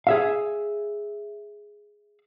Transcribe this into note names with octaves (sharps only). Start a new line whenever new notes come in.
G#4 E5 F5